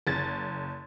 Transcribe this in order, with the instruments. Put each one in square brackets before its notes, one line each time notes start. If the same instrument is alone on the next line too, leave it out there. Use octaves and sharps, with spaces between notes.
[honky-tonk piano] F#1 G#6 A6